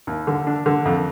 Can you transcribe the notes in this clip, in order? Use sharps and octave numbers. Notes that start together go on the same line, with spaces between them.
D#2
D3
D4
D3
F2